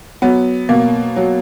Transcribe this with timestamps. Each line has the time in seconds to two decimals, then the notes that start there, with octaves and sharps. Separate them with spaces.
0.22 F#3 B3
0.69 B2 A#3
1.16 F#3